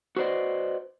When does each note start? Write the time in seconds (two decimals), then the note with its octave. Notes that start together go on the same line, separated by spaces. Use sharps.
0.17 F#4 B4 C5 D5 D#5